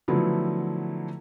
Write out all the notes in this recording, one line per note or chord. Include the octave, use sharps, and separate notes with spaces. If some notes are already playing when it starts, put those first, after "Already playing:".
D3 F3 F#3 A3 B3 E4